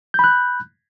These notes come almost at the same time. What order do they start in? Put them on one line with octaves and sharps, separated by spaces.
G6 B5 F#6